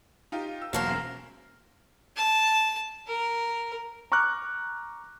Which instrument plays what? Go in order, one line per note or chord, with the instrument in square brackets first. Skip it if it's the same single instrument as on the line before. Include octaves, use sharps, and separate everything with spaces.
[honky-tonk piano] D#4 F4 G4
E6
[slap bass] E1 [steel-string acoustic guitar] F#3 A#3 C5 [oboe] A#4 [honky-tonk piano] C#5 A5
[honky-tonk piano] B1 F#2 E7
[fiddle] A5
A#4
[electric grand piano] A#5 C#6 D6 F6 F#6